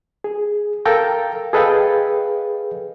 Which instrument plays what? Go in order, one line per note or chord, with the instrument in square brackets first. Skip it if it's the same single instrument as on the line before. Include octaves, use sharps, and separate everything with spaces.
[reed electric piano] G#4
A4 A#4 F5 G5 A#5
G#4 A4 B4 D#5 F5 G5